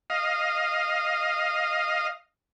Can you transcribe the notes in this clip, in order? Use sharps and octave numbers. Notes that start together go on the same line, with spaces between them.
D#5 F5